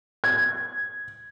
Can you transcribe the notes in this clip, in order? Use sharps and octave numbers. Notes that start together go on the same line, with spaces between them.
G#6